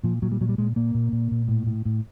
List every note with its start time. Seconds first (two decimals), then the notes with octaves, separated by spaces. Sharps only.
0.04 A#2 F3
0.22 A#2 F#3
0.32 G3
0.41 A#2 F#3
0.49 G3
0.58 A#2 G#3
0.76 A#2 A#3
0.94 A#2
1.12 A#2
1.31 A#2
1.48 A2
1.67 A2
1.85 A2